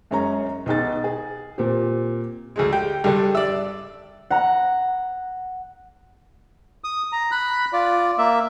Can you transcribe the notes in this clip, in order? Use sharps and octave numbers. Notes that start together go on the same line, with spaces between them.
F#2 G#3 C#4 C#5 A#5
B1 D#4 G#4 A6
G#4
A#2 C4 G4
D2 G#2 G#3
G4
G2 D3 G3
D5 E5
F#5 A#5 F#6
D#6
A#5
B5 F#6
F4 D5
A#3 E5